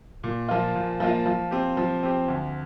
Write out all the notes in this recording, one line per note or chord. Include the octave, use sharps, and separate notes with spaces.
A#2
F3 A#3 F4
A#2
F3 A#3 F4
F3
C4 G4
F3
C4 G4
D2